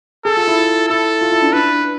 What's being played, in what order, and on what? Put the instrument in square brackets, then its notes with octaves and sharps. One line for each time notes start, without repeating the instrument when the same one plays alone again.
[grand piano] G#4 [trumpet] A4
[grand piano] F4
E4
F4
[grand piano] E4 [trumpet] A4
[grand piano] F4
E4
D4
[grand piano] D4 [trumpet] B4